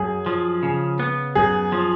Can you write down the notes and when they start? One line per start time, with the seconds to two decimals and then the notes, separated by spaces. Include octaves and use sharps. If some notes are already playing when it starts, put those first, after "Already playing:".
Already playing: F#2 G#4
0.26 F3
0.63 C#3
0.99 B3
1.35 F#2 G#4
1.72 F3